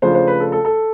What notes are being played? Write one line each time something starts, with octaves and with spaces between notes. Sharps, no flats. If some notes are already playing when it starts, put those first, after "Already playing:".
C#3 F3 A3 D4 F4 C5
C5
B4
A4
A4
A4